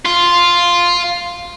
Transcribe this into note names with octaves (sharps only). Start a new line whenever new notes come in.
F4